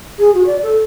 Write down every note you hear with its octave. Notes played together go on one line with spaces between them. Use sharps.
G#4
F#4
D5
A4